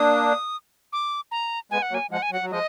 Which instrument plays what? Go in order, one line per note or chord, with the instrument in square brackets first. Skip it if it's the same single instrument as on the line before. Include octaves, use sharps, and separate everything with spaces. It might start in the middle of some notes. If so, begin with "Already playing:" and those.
Already playing: [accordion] A#3 D4 [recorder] D#6
[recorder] D6
A#5
[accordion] G#3 B3 [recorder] G#5
[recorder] F#5
[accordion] F#3 A#3 [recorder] G#5
[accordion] F3 G#3 [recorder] F#5
[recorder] G#5
[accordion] F#3 [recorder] F#5
[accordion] F#3
[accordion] F3 G#3 [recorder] D#5